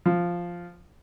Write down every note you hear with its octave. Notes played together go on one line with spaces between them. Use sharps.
F3